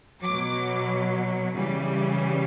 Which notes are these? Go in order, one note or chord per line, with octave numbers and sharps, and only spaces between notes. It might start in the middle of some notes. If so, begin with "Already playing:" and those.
B2 F#3 D6
C#3 E3 G3